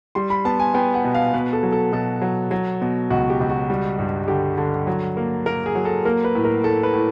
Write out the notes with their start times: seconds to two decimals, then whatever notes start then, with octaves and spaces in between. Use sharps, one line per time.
0.15 G3 C6
0.30 B5
0.45 B3 A5
0.60 G#5
0.74 B3 G5
0.94 F#5
1.04 B2
1.15 F5
1.34 B2 B4
1.53 A4
1.63 F#3
1.73 A4
1.93 B2 A4
2.22 F#3
2.51 F#3
2.82 B2
3.10 C#2 F#4
3.30 G4
3.40 C#2
3.50 F#4
3.70 G3
3.99 G2
4.28 D3 G4
4.58 D3
4.87 F#3
5.17 A#3
5.46 A#3 A#4
5.66 G#4
5.75 F#3
5.85 A4
6.05 A#3 A#4
6.24 B4
6.35 A2
6.45 A#4
6.64 A2 A4
6.83 B4
6.93 A2